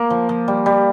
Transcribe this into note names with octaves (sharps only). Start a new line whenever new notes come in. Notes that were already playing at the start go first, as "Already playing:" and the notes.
Already playing: A#3
F3
F3
G3
G3